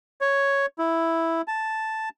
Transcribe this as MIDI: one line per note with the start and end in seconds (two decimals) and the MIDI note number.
0.21 0.66 73
0.79 1.41 64
1.48 2.09 81